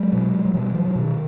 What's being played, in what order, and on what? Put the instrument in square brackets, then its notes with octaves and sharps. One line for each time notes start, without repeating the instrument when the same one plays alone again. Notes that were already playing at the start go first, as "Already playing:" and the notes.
Already playing: [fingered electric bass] F#3 G#3
B2
F#3
B2 F3 G3
E3 F#3
E3
B2 D#3